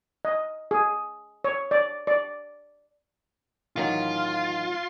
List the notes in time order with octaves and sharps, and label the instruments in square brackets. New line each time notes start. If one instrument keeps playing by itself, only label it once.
[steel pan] D#5
G#4
C#5
D5
D5
[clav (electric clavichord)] A1 D#3 F#3 [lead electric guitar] F4